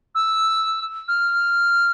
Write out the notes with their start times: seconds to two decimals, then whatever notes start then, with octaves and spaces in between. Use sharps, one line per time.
0.15 E6
1.08 F6